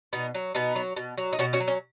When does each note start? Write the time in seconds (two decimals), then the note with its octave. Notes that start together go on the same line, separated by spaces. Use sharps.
0.13 B2 B3 D#4
0.34 F#3
0.55 B2 B3 D#4
0.75 F#3
0.97 B2
1.18 F#3
1.33 D#4
1.39 B2 C#4 F#4
1.53 C#4 F#4
1.60 F#3
1.68 C#4